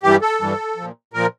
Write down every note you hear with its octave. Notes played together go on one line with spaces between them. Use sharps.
G2 E3 G3 G4
A4
G2 E3 G3
F3
A#2
A#2 F3 A#4